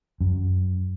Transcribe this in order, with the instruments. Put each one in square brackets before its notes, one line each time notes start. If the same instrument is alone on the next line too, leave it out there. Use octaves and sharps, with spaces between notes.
[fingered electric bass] F#2